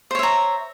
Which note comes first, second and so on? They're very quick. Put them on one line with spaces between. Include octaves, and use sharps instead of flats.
C5 C#5 E5 A#5